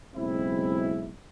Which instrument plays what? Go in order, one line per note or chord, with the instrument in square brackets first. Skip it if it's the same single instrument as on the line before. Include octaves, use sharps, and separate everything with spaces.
[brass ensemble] F#1 B1 G#3 C4 E4